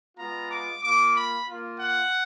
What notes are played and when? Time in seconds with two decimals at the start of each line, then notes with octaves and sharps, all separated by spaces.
0.16 G#3 B3 F4 A#5
0.50 D6
0.82 A#3 F4 D6
1.14 B5
1.45 A#3 F4
1.79 F#5